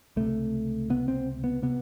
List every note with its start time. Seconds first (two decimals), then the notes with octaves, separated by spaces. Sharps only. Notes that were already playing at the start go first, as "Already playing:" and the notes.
0.16 C#2 C3 A3
0.90 C#2 C3 B3
1.08 C4
1.44 B3
1.62 C3 B3